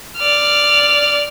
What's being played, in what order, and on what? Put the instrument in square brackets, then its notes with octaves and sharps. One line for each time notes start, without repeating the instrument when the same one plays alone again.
[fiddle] D5 F6